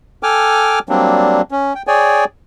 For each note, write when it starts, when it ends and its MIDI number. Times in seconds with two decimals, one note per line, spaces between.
0.23 0.79 69
0.23 0.79 79
0.23 0.79 80
0.23 0.79 86
0.23 0.79 89
0.89 1.42 54
0.89 1.42 55
0.89 1.42 58
0.89 1.42 60
0.89 1.42 62
1.51 1.73 61
1.75 1.83 79
1.87 2.25 68
1.87 2.25 73
1.87 2.25 74
1.87 2.25 79
1.87 2.25 80